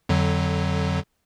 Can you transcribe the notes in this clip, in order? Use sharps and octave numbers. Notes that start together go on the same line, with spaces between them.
F2 D3 F#3